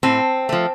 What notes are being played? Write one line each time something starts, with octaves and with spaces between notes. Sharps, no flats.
A2 C4
F3 A3